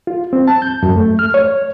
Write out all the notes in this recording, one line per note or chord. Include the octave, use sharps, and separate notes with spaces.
F4
C4
A5
G6
F#2
A3
F6
C#5